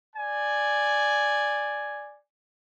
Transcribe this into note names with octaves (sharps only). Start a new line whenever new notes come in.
D5 G#5